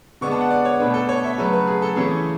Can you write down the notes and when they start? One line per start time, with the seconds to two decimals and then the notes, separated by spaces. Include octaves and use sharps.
0.21 D3 G#3 B3 D4 C#6
0.31 A5
0.41 F#5
0.50 D5
0.65 C#5
0.80 B2 A3 D4 B4
0.94 A4
1.09 C#5
1.24 E5
1.38 C#3 F#3 A3 B4
1.53 B4
1.67 G#4
1.82 A4
1.96 C#3 E3 A3 C#4 E4 G#4